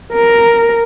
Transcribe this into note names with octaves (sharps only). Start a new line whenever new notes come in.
A#4